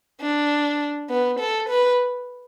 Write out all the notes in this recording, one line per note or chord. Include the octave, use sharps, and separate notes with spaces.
D4
B3
A4
B4